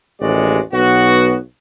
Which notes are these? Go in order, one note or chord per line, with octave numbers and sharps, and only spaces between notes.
A1 D#2 G#3 F#4 D5
B1 B3 F#4